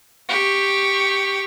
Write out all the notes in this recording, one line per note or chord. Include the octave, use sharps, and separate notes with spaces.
G4 C#6